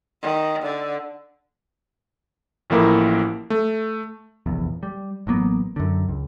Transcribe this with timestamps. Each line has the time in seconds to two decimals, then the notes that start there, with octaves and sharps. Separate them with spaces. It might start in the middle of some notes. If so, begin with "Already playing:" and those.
0.22 D#3
0.62 D3
2.70 A1 A2 F3 A#3 E4 A#4
3.50 A3
4.46 F1 A#1 E2
4.83 G3
5.27 A1 F#3 A#3 B3
5.76 F#2 D3
6.08 C#2